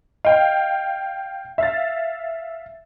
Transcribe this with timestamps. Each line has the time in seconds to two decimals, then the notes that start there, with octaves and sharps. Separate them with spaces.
0.25 D#5 F5 G5
1.58 E5 F5 A6